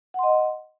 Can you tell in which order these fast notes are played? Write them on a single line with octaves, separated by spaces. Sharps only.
F#5 C6 D#5